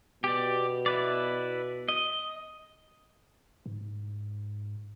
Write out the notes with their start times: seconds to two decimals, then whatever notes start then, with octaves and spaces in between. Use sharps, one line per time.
0.24 B2 G4 D5
0.86 E4 B4 D5
1.89 D#5
3.66 G#2